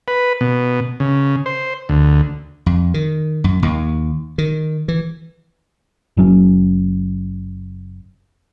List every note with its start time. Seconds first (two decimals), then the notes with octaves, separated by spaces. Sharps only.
0.08 B4
0.41 B2
1.00 C#3
1.46 C5
1.89 D2
2.66 F2
2.94 D#3
3.44 F#2
3.63 D#2
4.38 D#3
4.88 E3
6.17 F#1 F#3 C#4